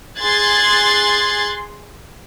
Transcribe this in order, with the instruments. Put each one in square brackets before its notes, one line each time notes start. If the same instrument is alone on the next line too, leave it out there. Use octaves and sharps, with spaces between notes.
[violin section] G#4 C6 F#6 G#6 A6